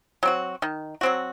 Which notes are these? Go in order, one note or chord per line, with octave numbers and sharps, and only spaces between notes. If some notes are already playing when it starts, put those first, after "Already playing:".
F#3 C4 F#4
D#3
F#3 C4 F#4